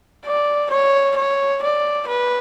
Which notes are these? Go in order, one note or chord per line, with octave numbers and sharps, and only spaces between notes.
D5
C#5
C#5
D5
B4